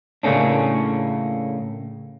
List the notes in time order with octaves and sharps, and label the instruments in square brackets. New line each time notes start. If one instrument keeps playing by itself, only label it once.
[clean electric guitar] A2 C#3 A3 A#3 C#4 D4